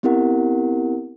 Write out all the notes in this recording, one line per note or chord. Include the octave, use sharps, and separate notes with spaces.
B3 C4 E4 G4 A#4 F#5